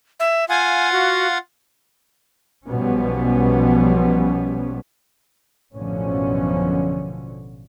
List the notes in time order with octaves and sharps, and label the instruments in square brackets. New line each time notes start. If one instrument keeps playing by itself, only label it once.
[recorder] E5
[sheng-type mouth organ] F4 F5 F#5 [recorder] G#5
[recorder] F#4
[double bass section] B1 B2 F3 G3 B3 C#4
A1 F#2 B2 D3 F3 C#4